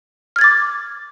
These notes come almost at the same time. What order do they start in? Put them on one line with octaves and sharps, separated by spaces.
F6 G#6 A6 D6